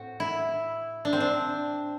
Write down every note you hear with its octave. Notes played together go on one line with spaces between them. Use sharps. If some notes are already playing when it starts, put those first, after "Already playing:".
Already playing: A2 C4 F#4
E4
D4
C4
D4